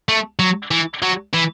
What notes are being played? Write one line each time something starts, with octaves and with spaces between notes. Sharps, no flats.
A3
F#3
E3
F#3
E3